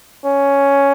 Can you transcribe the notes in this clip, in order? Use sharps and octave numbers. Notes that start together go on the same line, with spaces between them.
C#4